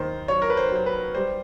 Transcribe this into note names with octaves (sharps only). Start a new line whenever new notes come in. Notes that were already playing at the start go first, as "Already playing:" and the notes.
Already playing: D#2 D#3 C5
F#3 C#5
A#4
B4
C5
F#3 C5
B4
G3 C5